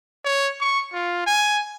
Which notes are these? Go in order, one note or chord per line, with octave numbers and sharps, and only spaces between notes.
C#5
C#6
F4
G#5